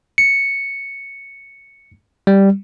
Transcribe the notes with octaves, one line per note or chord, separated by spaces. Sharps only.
C#7
G3